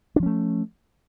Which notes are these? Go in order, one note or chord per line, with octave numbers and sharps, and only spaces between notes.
F3 A3 C#4 D4